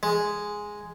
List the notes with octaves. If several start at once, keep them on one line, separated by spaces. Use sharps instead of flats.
G#3